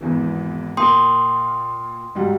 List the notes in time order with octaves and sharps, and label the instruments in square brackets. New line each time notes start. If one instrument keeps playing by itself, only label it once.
[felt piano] G#1 E2 E3
[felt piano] A#2 A#3 [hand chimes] G5 C6 D#6
[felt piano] G#2 F#3 G3